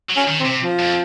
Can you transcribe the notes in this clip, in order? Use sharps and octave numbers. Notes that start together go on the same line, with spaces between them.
F#3
C#4
D#3
C4
C3
F3
F2